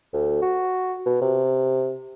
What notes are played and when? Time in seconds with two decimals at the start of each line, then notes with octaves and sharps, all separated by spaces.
0.13 D2
0.42 F#4
1.06 B2
1.21 C3